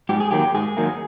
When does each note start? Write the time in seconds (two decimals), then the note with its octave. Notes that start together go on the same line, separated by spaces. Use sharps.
0.09 G#2 G4
0.20 G#4
0.31 D#3 F#3 A#3 G4
0.54 G#2 G#4
0.77 D#3 F#3 A#3